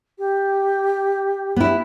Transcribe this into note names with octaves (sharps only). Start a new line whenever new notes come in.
G4
B3 E4